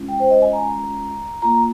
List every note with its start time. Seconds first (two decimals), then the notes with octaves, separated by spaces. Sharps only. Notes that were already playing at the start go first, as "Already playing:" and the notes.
Already playing: G#3 C#4 F4
0.08 G5
0.20 C5
0.30 D#5
0.42 G#5
0.53 A#5
1.42 A#3 F4 A#5